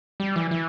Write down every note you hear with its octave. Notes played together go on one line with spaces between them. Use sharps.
G3
E3
E3